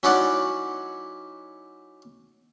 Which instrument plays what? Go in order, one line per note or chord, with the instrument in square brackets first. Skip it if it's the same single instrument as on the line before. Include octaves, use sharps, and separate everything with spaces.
[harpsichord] F#3 C#4 D#4 E4 D5 F#5